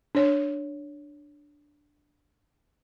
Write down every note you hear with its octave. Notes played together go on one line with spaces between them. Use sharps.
D4 C#5